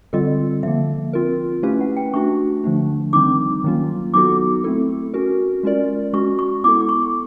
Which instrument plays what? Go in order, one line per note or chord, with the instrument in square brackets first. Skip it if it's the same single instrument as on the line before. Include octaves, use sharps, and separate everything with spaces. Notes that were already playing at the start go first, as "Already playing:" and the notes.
[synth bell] D3 G3 C4 F4 A4 [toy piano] D#5
[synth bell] D3 F3 A#3 [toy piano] E5
[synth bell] C4 F4 A#4
[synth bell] A3 C#4 E4 G4 B4 [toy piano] F5
[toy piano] F#5
G5
[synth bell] A3 D4 F#4 [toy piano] C#6
[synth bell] D3 F3 A3 D4
[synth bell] D#3 G3 C4 D#4 [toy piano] D6
[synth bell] D#3 F#3 A#3 C#4 F4
[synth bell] F#3 B3 D#4 F#4 A4 [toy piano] D6
[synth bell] A3 C4 E4 A4
C#4 F#4 A#4
G#3 C#4 F4 A#4 D5
[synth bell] G#3 C#4 F#4 [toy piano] C#6
[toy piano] C#6
[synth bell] B3 E4 A4 [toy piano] D6
[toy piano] D6
C#6